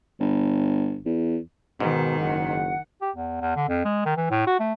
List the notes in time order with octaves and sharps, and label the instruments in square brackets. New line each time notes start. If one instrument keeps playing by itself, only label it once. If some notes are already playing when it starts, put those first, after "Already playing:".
[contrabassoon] G1
E2
[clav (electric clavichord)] G#2 [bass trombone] B2 [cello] D#3
[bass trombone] F#1 [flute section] F#5
[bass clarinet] G4
E2
E2
D3
F2
G#3
D#3
E3
A2
F#4
A3